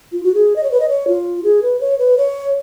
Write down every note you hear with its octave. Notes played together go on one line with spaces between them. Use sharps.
F4
F#4
G#4
D#5
C#5
B4
D#5
C#5
F4
G#4
B4
C#5
B4
C#5